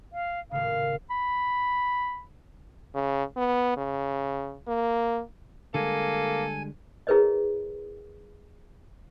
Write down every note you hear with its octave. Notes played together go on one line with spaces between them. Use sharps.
F5
D#1 A2 C#3 F5
B5
C#3
B3
C#3
A#3
D3 G3 G#3 A#3 A4 G#5
E4 G#4 A#4 B4 C#5 D#5